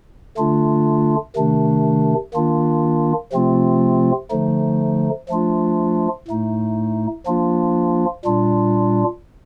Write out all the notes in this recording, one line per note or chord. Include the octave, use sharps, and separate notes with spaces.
D3 A3 D4 F4
C3 D#3 A3 D4
D#3 A#3 D4 F4
C3 F3 A3 C4 F4
D3 F3 A3 D#4
F3 A3 D4 F4
A2 A3 D#4
F3 A#3 D4 F4
A#2 G3 D4 F4